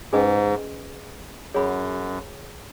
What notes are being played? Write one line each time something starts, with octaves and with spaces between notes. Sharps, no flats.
G#2 C#4 G#4 B4 D#5 G#5
F#2 G#4 C#5 F#5 B5